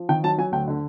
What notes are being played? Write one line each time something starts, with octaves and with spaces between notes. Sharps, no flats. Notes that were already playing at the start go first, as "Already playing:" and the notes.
Already playing: F3
D#3 G5
F#3 A5
F#3 G#5
D2 G5
D3